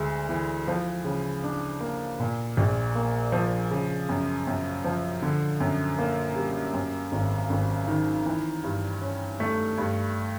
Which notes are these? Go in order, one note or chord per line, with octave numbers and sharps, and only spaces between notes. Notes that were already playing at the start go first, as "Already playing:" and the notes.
Already playing: D2 G#3
E3
F3
C#3
D4
A#3
A#2
A#1
A#3
F3
C#3
F#2
F#2
F3
D3
F#2
A#3
G3
F#2
G#1
G#1
D#3
E3
G2
C#4
A3
G2